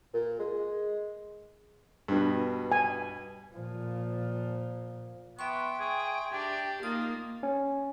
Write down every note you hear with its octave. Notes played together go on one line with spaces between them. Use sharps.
A#2
G#3
G2 B2
G#5
A#2 F3
B3 E5 G5 C6 C#6
G#4
D4 G4
A#3 D#4 F4 D#6
C#4